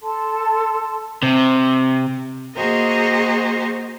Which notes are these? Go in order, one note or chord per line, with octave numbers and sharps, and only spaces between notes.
A4 A5 C6
C3
A#3 F#4 G#4 C5 D#5 A#5